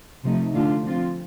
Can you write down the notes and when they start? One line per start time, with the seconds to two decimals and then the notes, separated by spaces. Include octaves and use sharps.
0.24 C3 F3 A3 D#4
0.54 D3 A3 D4 F4
0.84 F3 C4 F4